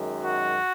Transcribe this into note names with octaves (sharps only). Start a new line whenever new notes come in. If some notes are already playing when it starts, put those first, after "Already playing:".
Already playing: F#2 D#3 G#3
F#4